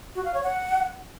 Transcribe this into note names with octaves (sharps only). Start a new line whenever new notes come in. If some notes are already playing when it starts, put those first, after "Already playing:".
F#4
F5
C#5
F#5